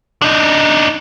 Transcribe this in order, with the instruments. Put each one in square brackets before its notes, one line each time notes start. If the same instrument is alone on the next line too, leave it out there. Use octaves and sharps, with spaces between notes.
[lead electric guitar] D4 D#4